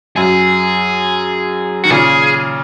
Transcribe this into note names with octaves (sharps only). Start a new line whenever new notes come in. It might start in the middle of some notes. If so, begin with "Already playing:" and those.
F#2 G#4
D#3 F#4
A#2 C#3 G#4